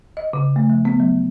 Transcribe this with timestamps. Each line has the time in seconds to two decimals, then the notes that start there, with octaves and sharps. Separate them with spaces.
0.17 D#5
0.33 C#3
0.56 A3
0.70 F3
0.85 B3
1.00 F#3